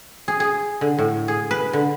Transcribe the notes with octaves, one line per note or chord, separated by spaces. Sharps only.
G#4
G#4
D3
A2
G#4
B4
D3